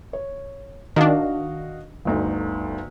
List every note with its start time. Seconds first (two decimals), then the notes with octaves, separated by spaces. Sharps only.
0.13 C#5
0.96 D#3 D4 F#4 D#5 F5
2.05 G1 D2 D#4